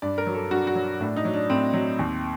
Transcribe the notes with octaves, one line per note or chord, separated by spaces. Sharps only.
G2 D5
A#4
F#3
A4
G2 F#4
F#4
F#3
A2 D4
D#4
F#3
D4
A2 C4
F#3
D#2